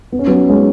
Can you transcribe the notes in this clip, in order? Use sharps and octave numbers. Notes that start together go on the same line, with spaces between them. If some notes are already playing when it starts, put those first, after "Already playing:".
B3
C#4
F#3 B3
G#3 C#4